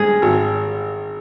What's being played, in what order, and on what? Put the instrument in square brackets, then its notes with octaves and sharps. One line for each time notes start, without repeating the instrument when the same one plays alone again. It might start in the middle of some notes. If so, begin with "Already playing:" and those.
Already playing: [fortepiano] G2 G#3 [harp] G#4
[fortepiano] G#1